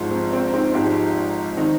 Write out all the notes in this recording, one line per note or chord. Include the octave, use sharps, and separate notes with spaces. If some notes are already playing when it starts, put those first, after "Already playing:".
Already playing: G#1 G#2 F3
C4
C4
C4 D#4
G#1 G#2 F3 D#4 G4
D#3 C4 D#4